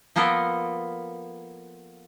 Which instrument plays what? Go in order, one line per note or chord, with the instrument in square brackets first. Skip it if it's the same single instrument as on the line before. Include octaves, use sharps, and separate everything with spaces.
[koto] F3 A#3 B3 A4 A#4